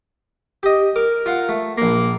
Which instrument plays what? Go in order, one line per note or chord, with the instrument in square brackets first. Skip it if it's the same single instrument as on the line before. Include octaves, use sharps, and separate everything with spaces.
[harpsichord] G4 D#5
[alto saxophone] A#4 [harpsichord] D6
[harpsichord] F4 F5 F#5
A3
[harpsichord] A#1 A#5 [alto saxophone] A#3